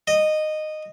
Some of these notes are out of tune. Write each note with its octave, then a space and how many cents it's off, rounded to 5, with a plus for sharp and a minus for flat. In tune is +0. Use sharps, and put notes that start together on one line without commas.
D#5 -10